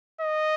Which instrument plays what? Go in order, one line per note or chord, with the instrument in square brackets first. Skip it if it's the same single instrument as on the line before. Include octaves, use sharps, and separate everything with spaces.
[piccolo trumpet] D#5